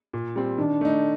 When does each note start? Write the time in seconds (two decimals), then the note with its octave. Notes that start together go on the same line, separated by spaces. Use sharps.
0.13 A#2
0.36 G3 C4
0.58 D#3 D4
0.81 A3 D#4